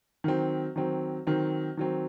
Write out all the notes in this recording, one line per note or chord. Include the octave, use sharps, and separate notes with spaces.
D#3 F#3 C4
D#3 F#3 C4
D#3 F#3 C4
D#3 F#3 C4